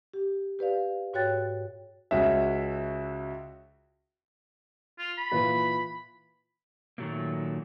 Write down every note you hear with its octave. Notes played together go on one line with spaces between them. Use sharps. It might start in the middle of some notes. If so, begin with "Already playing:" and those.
G4
G4 B4 D5 F5
G#2 F#4 C#5 G5 F#6 A6
C#2 C#4 F#4 E5
F4
B5
A#2 E3 B4
A#2 D#3 F3 F#3 A3 A#3